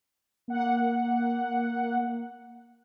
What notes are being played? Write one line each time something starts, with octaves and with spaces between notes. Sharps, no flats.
A#3 F#5